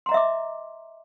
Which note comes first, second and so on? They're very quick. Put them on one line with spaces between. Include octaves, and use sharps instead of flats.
C6 A#5 D#5 E5 D6